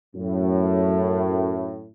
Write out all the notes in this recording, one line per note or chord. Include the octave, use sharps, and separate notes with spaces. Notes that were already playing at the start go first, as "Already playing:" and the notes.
F#2 A2